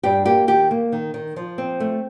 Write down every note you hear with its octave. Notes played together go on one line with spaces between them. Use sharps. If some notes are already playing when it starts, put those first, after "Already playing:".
G2 G4
A#3 G4
D#3 G4
A#3
D#3
D#3
F3
C4
A3